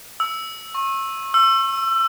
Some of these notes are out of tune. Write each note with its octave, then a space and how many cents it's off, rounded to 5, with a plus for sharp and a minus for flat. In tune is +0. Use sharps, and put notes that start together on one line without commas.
E6 -5
C#6 -35
E6 +25